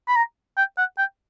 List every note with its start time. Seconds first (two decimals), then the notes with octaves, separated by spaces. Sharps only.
0.08 B5
0.16 A#5
0.57 G5
0.78 F#5
0.98 G5